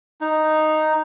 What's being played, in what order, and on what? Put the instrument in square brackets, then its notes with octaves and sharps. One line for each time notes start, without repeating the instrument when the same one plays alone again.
[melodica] D#4